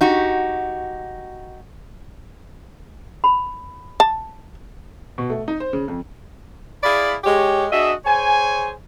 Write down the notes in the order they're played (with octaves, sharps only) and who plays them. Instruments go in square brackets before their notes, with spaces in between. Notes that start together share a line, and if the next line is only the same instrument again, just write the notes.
[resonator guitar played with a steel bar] D#4 F#4 G4
[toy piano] B5
[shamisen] A5
[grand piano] B2
A3
D#4
C5
C#3
F2
[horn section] E4 G#4 D5 F5 B5
G#3 G4 C#5
D4 F#4 G#4 D#5 E5
G#4 C5 C#5 G#5